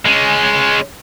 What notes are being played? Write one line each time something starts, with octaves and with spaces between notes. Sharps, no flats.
G#3 C#4